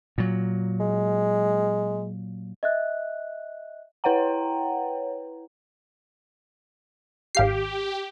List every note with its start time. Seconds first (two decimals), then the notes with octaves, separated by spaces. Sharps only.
0.18 A#2 F#3
0.80 G#3
2.63 D#5 E5 F#6
4.04 E4 B4 C#5 F#5 G5 A#5
7.35 G#1 G4 F5 C7